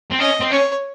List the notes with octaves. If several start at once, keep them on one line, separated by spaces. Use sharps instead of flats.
C4
C#4 D#5
C4
C#4 C#5